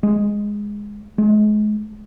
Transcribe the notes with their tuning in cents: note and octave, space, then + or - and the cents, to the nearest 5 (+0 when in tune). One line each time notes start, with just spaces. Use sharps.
G#3 -5
G#3 +35